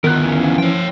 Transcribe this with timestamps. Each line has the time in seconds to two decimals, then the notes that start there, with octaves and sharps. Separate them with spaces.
0.04 D2 D#3 B3 A#4 F#6
0.24 E3 C#4 F5
0.58 F3 C#5 G5